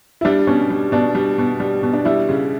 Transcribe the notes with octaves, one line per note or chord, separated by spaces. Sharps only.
E4
G3 D4
B2 C#4
G3
B2 D4
G3
B2
G3
B2
D4
G3 E4
C#3